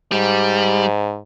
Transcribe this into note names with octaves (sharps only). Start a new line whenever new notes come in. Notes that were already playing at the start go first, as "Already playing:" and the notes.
G#2 G3